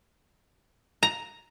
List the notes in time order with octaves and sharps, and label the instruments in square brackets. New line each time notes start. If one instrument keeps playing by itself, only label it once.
[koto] A#5